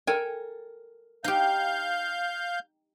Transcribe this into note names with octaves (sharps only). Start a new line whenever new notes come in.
A4 A#4 G5 G#5
D#4 G4 F5 G6